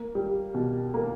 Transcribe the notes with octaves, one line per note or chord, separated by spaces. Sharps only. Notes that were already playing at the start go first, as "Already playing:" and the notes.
Already playing: A#3
G3
B2
A#3